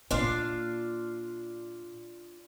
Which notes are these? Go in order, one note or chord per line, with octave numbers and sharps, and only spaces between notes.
A#2 A#3 D4 F4 F5